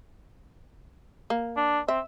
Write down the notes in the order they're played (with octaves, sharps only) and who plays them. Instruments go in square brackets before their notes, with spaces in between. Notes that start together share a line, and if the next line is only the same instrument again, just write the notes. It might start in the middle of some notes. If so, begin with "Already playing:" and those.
[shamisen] A#3
[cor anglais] D4
[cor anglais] C4 [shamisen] E5